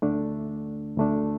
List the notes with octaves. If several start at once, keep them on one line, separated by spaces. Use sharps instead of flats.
D2 D3 A3 D4
D2 D3 A3 D4